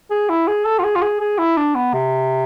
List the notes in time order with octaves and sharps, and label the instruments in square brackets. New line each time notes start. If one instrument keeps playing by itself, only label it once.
[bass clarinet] G#4
E4
G#4
A4
F4
G#4
F4
G#4
G#4
E4
D4
B3
C3